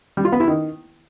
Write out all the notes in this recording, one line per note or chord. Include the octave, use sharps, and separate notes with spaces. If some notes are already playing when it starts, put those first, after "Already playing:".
G3
F4
B3
E4
D#3